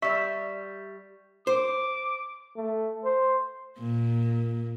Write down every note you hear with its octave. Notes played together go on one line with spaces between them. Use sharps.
G3 E5 C#6 B6
C5 D6
A3
C5
A#2